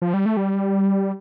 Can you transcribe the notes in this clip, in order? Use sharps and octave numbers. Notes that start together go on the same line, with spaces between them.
F3
G3
A3
G3